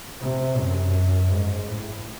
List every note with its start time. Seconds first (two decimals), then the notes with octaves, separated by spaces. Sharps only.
0.21 C3
0.57 F#2
1.31 G#2
1.68 A2